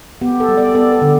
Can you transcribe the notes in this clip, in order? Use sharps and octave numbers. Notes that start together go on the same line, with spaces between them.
B3 G4
A4
G3
D5
B3 A4
A4
D3